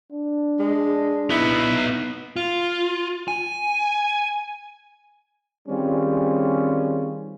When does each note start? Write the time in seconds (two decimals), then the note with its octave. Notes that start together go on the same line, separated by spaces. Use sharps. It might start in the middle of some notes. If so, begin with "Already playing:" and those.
0.12 D4
0.59 G#3
1.30 B3 D#4 E4
2.36 F4
3.28 G#5
5.69 D#3 G3 C4 C#4 F4 G#4